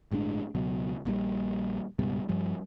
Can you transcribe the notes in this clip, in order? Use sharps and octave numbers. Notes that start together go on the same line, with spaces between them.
G1 A2 G#3 D4
C#2 B2 F#3
A#1 A#2 D3 G3
C#2 G#2 B2 G3
G2 F3 G3